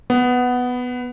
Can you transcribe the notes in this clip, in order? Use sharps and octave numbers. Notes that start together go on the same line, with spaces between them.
B3